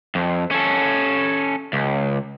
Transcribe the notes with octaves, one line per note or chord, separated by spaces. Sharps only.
F2
C#4 A4
C#2